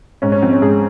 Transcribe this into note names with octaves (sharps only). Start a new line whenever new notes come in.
G#2 C#4
C#4
F3 C4
C#4
G#2 G#4